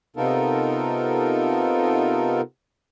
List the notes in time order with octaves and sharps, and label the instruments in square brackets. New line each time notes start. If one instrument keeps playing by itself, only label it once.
[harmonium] C3 B3 D#4 F4 A4 A#4